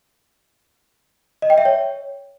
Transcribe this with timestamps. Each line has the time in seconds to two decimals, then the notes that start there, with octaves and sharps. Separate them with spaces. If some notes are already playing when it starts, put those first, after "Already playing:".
1.42 D#5
1.50 G5
1.58 E5
1.65 C#5